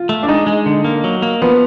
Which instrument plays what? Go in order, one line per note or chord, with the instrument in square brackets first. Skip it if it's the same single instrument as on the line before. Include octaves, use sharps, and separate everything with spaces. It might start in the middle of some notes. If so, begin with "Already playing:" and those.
Already playing: [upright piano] F4
[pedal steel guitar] A3
[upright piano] D4
[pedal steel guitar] G#3 [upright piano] D#4
[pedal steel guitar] G#3
D3
A#3
F#3
A#3
[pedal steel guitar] F3 [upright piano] B3